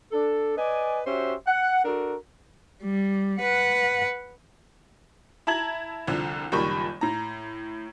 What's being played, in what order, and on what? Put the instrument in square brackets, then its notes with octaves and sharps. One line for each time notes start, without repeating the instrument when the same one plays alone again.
[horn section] D4 A4
B4 D5 D#5 G#5
C#4 F#4 G4 C5 E5
F#5
D4 F#4 A4 A#4
[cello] G3
B4 F#5
[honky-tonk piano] E4 E5 A5 A#5 G#6 F#7
C2 D3 F3
F#1 A#2 D#3 G3 B5 C#6
A2 A#5